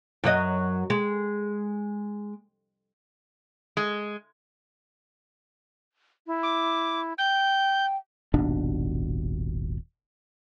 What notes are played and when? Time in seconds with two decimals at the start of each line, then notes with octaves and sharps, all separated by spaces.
0.24 F#2 F#3 D#5
0.90 G#3
3.77 G#3
6.27 E4
6.43 D6
7.18 G5 G6
8.34 D#1 G#1 B2 D4